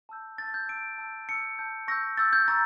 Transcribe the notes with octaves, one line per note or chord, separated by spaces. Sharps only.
A5 E6 G6
A5 E6 G6 A6
G6
A5 E6 G6 D7
A5 E6 G6
A5 E6 G6 C#7
A5 E6 G6
C#6 E6 G6 A#6
C#6 E6 G6 A6
G6
A#5 C#6 E6 G6 A6